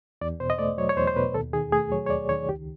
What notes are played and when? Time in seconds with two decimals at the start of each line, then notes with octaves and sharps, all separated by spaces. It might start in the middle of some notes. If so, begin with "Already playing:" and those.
0.21 E2 D5
0.40 B2 C5
0.50 D#5
0.59 A3 D5
0.78 F#3 C#5
0.89 C#5
0.97 E2 C5
1.07 C5
1.16 B2 B4
1.34 D#2 A4
1.53 D#3 G#4
1.72 A3 G#4
1.91 F#3 C#5
2.06 C#5
2.10 D#2 D5
2.29 D#3 C#5
2.49 C#2 G4